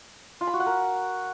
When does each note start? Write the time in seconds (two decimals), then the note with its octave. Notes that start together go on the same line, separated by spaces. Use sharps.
0.41 F4
0.47 B5
0.54 F#4
0.60 F#5
0.66 A#4